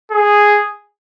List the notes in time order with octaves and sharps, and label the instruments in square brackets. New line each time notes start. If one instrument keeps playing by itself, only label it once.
[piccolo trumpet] G#4